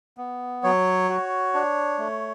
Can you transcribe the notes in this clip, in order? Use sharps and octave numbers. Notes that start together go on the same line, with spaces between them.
B3
F#3 C#5
F#4
D4
A3